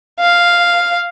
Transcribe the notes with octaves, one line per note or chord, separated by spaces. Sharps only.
F5